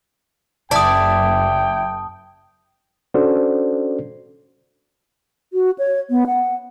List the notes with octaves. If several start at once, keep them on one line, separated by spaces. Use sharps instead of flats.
F#1 E4 D5 G5 A5 D#6
C#4 D4 F#4 A4 C5 D5
F#4
C#5
B3
F#5